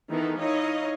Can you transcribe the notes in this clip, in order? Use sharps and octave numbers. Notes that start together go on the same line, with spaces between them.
D#3 E3 B3 D#4 A4 B4
D#4 E4 C#5 D#5 F5